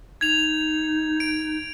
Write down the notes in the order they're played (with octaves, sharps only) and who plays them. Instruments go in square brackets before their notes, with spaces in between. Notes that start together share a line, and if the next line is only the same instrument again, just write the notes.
[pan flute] D#4 [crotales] G#6 F7
[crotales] D7